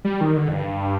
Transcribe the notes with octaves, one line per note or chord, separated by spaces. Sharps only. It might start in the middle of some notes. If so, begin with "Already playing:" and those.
G3
D#3
D3
F2
G2